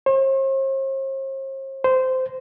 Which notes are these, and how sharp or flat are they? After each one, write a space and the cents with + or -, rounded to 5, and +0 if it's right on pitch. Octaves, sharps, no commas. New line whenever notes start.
C5 +45
C5 -15